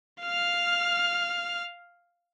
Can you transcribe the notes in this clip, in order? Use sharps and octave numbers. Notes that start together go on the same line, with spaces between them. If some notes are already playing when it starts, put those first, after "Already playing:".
F5 F6